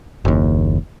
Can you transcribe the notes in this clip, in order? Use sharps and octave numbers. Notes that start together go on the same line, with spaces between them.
F#1 D#2